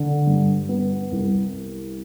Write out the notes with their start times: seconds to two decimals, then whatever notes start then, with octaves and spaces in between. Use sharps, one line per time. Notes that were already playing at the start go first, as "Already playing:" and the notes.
Already playing: D3
0.27 G2
0.69 B3
1.11 C2